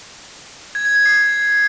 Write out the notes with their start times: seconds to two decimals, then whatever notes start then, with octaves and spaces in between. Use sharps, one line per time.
0.75 G#6
0.85 G#6
0.95 G#6
1.06 C7